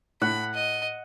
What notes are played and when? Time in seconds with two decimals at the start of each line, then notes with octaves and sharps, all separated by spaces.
0.22 A2 F#5 B5
0.54 D#5